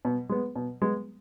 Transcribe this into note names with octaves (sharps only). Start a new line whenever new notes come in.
B2
G#3 B3
B2
G#3 B3